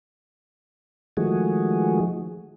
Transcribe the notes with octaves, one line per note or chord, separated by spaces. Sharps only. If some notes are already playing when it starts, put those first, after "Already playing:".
D#3 F3 G#3 A3 F#4 G#4